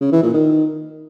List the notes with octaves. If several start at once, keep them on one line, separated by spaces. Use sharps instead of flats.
C#3
E3
A#2
D#3